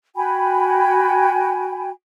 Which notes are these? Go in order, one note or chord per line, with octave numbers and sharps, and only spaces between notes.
F#4 G5 G#5 B5